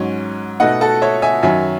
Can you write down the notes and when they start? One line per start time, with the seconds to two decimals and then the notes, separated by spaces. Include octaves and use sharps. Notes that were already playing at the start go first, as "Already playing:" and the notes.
Already playing: G#2 F#3 C#4
0.60 B2 A3 D#4 D#5 F#5
0.81 F#4 A4
1.02 C#5 E5
1.22 E5 G#5
1.43 F#2 D#3 F#3 C#4 E5 G#5